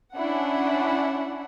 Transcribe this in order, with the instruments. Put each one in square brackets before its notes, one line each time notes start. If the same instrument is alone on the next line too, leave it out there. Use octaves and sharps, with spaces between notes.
[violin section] C#4 D4 E4 F#5